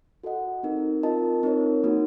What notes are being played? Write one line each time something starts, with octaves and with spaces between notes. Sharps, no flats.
F#4 A4 D#5 F#5
C4 D#4 A#4
C4 F4 A#4 D#5 A5
C4 D#4 A#4 C#5
A#3 D#4 F#4